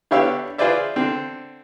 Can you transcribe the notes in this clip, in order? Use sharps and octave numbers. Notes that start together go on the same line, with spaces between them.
D3 B3 G4 C#5 F5 E6
F4 G#4 B4 C5 D5 E5
D3 C4